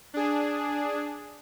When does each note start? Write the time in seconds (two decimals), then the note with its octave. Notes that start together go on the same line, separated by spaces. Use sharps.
0.14 D4 G#4